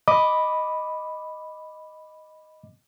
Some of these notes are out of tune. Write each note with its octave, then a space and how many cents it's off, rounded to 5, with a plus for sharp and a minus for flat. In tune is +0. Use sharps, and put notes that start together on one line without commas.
D#5 +0 B5 +0 D6 +0